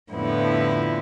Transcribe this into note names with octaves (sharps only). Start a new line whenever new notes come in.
F2 A2 D3 F3 B3 E4